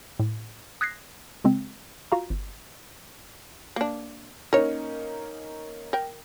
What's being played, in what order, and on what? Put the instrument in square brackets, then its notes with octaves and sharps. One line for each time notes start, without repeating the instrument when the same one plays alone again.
[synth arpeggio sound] A2
D#6 F#6 G#6 A#6 C7
C#3 G#3 C4
F4 F#4 F5 A#5
G1
[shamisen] A#3 D4
[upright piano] A#3 C#4 D#4 [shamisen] A#4 C#5
[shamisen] A#4 G5